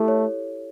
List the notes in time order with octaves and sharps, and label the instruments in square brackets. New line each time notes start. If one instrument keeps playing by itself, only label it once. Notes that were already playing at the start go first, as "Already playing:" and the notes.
Already playing: [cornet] A3 [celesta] E4 G4 A4
[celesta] C#5